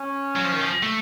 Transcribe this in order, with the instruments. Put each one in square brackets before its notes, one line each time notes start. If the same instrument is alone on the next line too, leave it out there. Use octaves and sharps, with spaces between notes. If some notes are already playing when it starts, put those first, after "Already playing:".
Already playing: [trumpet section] C#4
[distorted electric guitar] F#3
F3
D#3
F3
A3